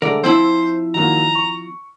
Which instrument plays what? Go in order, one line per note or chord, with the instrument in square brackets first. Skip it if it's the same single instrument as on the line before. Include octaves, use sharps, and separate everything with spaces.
[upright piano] D3 G#3 A3 [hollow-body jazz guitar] A#4 D5
[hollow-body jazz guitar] F3 C4 E4 [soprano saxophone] C5 [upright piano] E6
[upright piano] D#3 F#3 A#3 [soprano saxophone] A#5
[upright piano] C#6